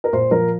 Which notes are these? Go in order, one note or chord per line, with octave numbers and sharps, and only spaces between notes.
A#4
A#2 C5
F3 A#4